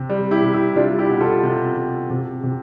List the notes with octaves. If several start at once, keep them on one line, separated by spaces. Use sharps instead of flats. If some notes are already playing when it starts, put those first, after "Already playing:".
Already playing: C3
G3
E4 G4
C3
E4 G4
G3 D4 F4
E4 G4
B2
F4 A4
C3
C3
C3
C3